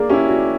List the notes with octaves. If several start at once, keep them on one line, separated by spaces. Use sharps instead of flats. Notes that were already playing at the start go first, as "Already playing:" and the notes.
Already playing: A#3 G#4 D5
C#4 E4 G4
F#4